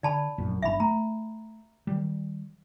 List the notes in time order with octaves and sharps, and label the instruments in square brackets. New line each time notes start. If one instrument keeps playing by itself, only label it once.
[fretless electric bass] D3 [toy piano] D5 A5 B5
[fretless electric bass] F1 A#1 F#2
[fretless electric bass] G1 C#3 D4 [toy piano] E5 B5
[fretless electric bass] A3 [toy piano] A#5
[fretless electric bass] D#3 G3